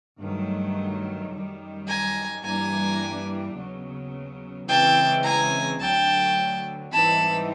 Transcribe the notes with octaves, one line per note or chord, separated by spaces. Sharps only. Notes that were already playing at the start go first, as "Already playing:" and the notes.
G2 D#3 F#3 A3
F#2 D#3 G3
G#5 A#5
G2 E3 G3 A#3 D4 G#5 A#5
D#2 C#3 F#3 B3
C#3 E3 G#3 C4 G5 A5
G#5 A#5
D2 D3 F#3 G5 A5
G#2 E3 G3 C4 D#4 A5 B5